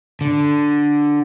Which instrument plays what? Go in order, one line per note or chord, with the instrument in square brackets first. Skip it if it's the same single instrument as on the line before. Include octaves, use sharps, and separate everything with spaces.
[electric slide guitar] D3